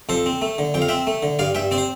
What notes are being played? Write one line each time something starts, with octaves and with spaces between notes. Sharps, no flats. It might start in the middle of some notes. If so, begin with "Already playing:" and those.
F2 A4 C5
C4
A3
D3
F2 G5
F5
C4 E5 G5
A3
D3
G2 D5 F5
G2 E5 G5
C4 D5
C5